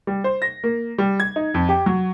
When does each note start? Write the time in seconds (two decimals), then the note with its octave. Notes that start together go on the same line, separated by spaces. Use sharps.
0.07 G3
0.24 C5
0.42 A#6
0.64 A#3
0.98 G3
1.20 G#6
1.36 D#4
1.54 F2
1.69 G4
1.86 F#3